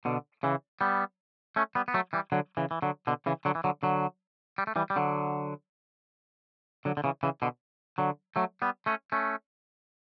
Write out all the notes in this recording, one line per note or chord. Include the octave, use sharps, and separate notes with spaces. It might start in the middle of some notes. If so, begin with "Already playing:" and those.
B2 D3
C#3 E3
G3 B3
A3 C#4
G3 B3
B3
F#3 A3
E3 G3
D3 F#3
C#3 E3
E3
D3 F#3
B2 D3
C#3 E3
D3 F#3
E3
D3 F#3
D3 F#3
G3
A3
E3 G3
G3
D3 F#3
D3 F#3
D3
C#3 E3
C#3 E3
B2 D3
D3 F#3
F#3 A3
G3 B3
A3 C#4
A3 C#4